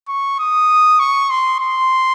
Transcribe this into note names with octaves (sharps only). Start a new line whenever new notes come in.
C#6
D#6
C#6
C6
C6